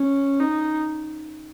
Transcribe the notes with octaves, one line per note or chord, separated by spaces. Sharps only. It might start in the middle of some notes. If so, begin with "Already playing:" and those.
Already playing: C#4
D#4